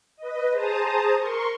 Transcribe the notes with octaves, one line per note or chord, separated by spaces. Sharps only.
B4 D#5
G#4 C5 A5 A#5 D#6
A#4 C6 C#6